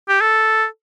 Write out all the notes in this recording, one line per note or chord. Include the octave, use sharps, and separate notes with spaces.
G4
A4